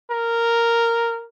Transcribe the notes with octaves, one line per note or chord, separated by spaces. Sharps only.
A#4